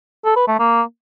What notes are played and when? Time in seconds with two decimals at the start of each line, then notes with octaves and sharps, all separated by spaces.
0.25 A4
0.36 B4
0.48 A3
0.59 A#3